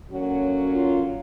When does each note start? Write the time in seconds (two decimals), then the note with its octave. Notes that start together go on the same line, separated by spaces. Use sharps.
0.10 D3 F#3 A#3 C#4 F#4
0.73 F4